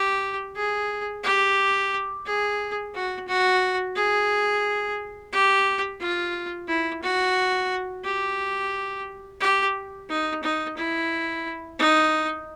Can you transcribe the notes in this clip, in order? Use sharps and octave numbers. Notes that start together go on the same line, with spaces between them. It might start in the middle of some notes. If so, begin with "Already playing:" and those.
Already playing: G4
G#4
G4
G#4
F#4
F#4
G#4
G4
F4
E4
F#4
G4
G4
D#4
D#4
E4
D#4